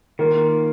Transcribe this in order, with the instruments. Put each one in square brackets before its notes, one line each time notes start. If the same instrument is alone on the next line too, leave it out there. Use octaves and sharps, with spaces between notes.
[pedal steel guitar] D#3 A#3 F4 [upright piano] A#4